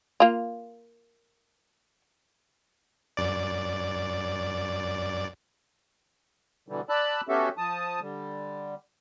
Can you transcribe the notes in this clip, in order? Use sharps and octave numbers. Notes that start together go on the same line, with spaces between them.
A#3 F4
F#2 D5
B2 D3 E3 G3
D5 A5 B5 E6 F#6
B3 C#4 F#4 G4 A4 E5
F3 A5 D#6
D3 G3